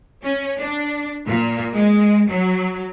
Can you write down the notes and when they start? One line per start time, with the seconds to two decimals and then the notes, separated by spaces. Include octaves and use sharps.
0.23 C#4
0.58 D4
1.26 A#2
1.74 G#3
2.29 F#3